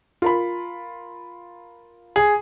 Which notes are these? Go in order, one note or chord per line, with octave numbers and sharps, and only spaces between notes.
F4 A#4 B5
G#4